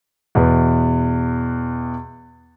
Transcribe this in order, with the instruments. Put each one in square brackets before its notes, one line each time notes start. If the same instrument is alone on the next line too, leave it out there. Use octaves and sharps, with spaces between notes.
[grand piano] E2 B2 B4